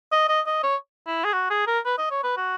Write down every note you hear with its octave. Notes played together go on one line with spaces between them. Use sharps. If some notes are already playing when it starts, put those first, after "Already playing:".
D#5
D#5
D#5
C#5
E4
G#4
F#4
G#4
A#4
B4
D#5
C#5
B4
F#4